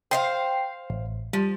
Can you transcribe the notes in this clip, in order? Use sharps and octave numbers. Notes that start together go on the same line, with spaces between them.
C5 D#5 F5 G5 C7
A1
F3 G3